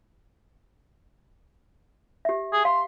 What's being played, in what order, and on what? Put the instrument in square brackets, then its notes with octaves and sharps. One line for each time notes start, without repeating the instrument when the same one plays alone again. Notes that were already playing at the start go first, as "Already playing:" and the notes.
[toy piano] G4 E5
[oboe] G#4
[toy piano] F5 [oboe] C6